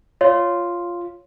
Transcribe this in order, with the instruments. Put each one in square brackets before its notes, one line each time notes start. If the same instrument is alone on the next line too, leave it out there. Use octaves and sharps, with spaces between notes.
[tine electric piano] F4 [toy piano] C#5